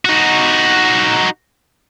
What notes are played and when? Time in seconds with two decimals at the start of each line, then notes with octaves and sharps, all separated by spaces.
0.05 D#4 F#4